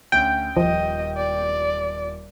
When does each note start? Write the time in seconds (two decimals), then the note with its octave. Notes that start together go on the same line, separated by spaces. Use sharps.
0.12 D2 C#4 G5
0.57 D#1 F3 D#5
1.17 D5